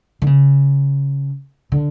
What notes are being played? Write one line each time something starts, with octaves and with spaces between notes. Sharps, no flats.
D3
C#3
D3